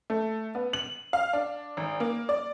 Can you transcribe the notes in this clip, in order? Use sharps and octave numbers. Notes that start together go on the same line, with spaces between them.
A3
B3
F#7
F5
D4
G#1
A#3
D5